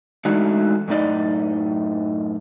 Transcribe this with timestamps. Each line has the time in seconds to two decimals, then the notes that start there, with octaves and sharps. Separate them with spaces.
0.25 E3 G#3 A3 D4 D#4 F#4
0.88 F#2 A2 D#4 D5 D#5